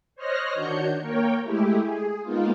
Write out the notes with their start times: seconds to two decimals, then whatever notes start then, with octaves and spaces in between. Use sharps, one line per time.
0.16 C5 C#5 D#5 F6 F#6 A#6
0.53 D#3 D4 F#4 C#5 G6 C#7
1.01 A#3 A#4 C#5 G5
1.43 G#3 A3 E4 G4
1.83 G#4
2.23 G#3 A#3 B3 D#4 F4